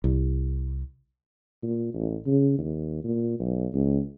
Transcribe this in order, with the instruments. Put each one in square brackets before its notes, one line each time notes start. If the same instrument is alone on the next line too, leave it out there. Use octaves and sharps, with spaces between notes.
[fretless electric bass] C2
[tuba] A#2
A1
C#3
D#2
A#2
B1
C#2